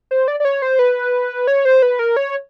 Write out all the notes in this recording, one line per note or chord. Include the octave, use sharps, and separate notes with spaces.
C5
D5
D5
C#5
C5
B4
C#5
C5
B4
A#4
C#5